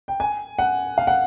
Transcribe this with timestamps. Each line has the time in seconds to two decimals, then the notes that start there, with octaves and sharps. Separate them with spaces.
0.08 G5
0.20 G#5
0.59 F#5
0.98 F5
1.07 F#5